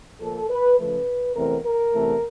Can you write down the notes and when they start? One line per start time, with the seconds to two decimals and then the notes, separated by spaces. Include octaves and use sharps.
0.20 A#2 F3 A#3 A4
0.49 B4
0.78 C#3 F3 A3 B4
1.35 E2 C3 E3 A3 C4 A#4
1.64 A#4
1.93 E2 C3 E3 A3